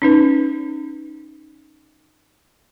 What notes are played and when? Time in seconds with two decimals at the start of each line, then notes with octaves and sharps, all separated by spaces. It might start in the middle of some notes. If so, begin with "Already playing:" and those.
0.02 C#4 D#4 B4